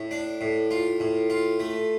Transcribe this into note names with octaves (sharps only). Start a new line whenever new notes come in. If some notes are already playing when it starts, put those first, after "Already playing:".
Already playing: A2
D4
A2
F4
A2
F4
A3